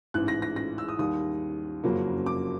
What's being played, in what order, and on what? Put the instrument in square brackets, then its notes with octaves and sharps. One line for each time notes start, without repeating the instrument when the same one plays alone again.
[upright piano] A1 G#2 E3 F#6
A#6
A#6
A#6
E6
D#6
D#2 D#3 G3 D#6
F#1 F2 C#3 F#3 A#3
D6